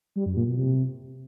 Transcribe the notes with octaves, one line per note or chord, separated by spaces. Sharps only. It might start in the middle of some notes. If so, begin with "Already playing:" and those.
G3
F#2
A#2
B2
C3